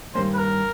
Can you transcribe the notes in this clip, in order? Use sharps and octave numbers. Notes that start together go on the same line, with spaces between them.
G2 D#3 G3 A#3 C#4 C5
B4
A#4